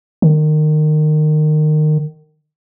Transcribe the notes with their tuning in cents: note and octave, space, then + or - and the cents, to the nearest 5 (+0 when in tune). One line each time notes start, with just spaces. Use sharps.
D#3 -25